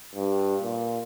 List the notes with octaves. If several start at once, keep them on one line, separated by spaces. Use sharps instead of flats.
G2
A#2